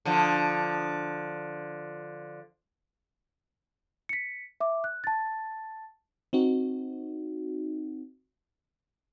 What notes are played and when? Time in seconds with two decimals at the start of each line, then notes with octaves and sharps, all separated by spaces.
0.05 D3 F3
4.09 B6 C#7
4.60 E5 D6
4.84 F#6
5.04 A5 A6
6.33 C4 D#4 F#4